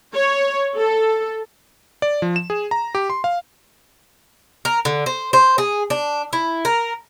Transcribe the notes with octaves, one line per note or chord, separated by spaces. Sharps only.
C#5
A4
D5
F3
E7
G#4
A#5
G4
C6
F5
A#4
D3
C5
C5
G#4
D4
E4
A#4